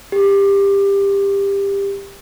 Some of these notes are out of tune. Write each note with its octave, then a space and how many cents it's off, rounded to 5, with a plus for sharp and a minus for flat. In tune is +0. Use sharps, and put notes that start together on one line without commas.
G4 +20